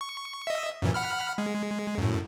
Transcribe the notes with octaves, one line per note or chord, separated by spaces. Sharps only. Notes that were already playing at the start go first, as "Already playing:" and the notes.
C#6
D#5 E5
F#2 A#2 E3
F#5 B5 F6
G#3
F#2 A2